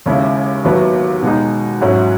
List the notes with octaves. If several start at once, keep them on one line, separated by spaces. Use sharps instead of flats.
D#2 C#3 G#3 C#4 E4
D#2 D#3 F#3 B3 E4
B2 G#3 D#4
G#2 F#3 C#4 E4